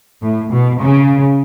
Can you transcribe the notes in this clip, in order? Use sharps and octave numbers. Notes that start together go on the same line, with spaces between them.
A2
B2
C#3